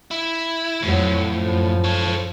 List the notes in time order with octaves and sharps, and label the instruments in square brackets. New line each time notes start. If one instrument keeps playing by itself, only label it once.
[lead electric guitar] E4
[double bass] F2 F#3 [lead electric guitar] A2
[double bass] F#2 F3
[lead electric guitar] A4 C#5